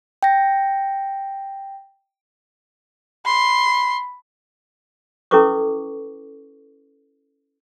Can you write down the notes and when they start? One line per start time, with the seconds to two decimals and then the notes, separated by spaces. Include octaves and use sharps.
0.23 G5 A#6
3.26 B5 C6
5.31 C#4 E4 A4 B4 C#6 D6